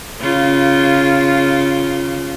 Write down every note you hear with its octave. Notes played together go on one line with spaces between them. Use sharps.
C#3 F4